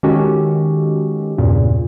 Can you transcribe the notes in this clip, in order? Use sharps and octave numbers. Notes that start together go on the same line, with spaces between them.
D#3 G#3 C#4 F#4 G4 A4
E2 G2 A#2 C#3